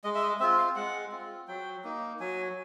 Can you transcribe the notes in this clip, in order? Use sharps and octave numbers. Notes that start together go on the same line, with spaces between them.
G#3 D#5
E5
D#5
C4 F4 E5
F5
G#3 F#5
C4 F4
F#3 G5
A#3 D#4
F#3 G#5